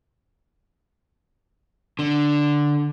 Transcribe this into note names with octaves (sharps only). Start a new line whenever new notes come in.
D3